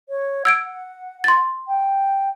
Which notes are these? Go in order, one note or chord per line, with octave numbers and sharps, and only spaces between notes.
C#5
F#5 E6 G#6 D7
C6 A6
G5